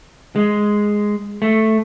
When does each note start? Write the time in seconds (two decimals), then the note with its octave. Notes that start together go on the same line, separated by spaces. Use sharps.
0.36 G#3
1.42 A3